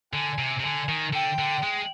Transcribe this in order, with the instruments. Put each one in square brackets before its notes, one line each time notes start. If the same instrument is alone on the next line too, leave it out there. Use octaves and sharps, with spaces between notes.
[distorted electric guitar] D3 [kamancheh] G#5
[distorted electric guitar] C3
C3
[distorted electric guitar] D3 [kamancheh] G#5
[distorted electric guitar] D#3
[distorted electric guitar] D3 [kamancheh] G5
[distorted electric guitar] D3
G#3